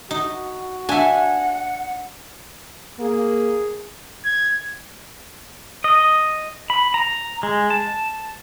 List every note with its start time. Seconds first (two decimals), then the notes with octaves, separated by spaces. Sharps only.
0.11 D#4 F#4
0.89 D4 E5 F#5 G#5
2.99 A#3 G#4
4.25 G#6
5.84 D#5
6.70 B5
6.94 A#5
7.43 G#3
7.70 A5